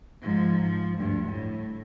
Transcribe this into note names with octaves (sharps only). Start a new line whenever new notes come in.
G#2 F3
F3
D2 G2
A2